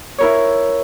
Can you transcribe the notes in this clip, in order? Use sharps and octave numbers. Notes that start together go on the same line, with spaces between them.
E4 A#4 C#5